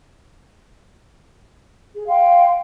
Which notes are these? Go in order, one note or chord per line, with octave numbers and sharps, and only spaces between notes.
G#4
F5 G5 C6